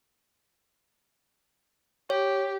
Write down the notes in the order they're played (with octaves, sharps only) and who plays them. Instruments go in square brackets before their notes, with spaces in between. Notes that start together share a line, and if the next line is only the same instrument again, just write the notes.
[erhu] G4 [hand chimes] C#5